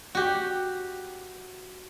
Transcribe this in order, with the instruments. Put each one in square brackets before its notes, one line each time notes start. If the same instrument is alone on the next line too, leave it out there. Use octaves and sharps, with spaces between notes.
[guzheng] F#4 G4